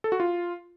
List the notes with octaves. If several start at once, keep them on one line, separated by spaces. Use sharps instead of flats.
A4
F#4
F4